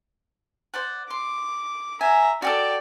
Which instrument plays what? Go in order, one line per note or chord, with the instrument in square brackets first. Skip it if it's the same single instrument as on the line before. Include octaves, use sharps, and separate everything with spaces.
[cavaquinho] C5 D5 F#5
[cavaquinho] C6 [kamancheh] D6
[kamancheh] E5 A#5 [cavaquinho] G#5
[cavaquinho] F#4 G#4 A4 [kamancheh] D5 G5